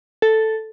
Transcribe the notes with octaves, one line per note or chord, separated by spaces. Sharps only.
A4